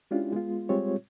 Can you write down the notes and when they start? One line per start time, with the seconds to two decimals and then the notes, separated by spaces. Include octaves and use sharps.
0.11 G#3 C#4 D4 E4 F4 G4
0.32 G#3 B3 F4
0.69 G3 G#3 C4 F4 G4 C#5